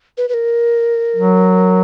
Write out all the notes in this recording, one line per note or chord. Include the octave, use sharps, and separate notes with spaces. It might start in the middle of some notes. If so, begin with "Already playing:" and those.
B4
B4
A#4
F#3